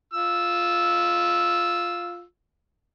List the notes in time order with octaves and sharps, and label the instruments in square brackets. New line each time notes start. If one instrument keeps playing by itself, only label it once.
[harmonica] F4 E6